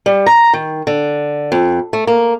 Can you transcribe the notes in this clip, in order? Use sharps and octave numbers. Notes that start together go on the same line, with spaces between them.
G3
A#5
D#3
D3
F2
A3
A#3